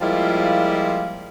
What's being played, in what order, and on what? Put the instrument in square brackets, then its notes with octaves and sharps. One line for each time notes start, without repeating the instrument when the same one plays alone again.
[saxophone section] F3 G3 G#3 A#3 E4 F4